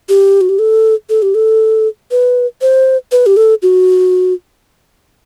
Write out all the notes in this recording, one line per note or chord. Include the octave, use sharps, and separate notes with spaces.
G4
F#4
G4
A4
A4
G4
A4
B4
C5
B4
G4
A4
F#4